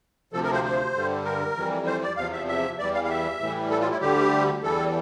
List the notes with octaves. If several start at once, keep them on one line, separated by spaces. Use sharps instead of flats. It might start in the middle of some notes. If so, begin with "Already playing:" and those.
D2 C3 F3 A4
A#4
C5
C5
G2 D3 G3
A#4
F2 E3 G3
C5
D5
E2 C3 F3 F5
E5
E5
E2 E3 G3 D5
F5
F5
E5
A2 E3 G3
A4
F4
E4
D2 D3 G3 G4
E2 E3 G3 A4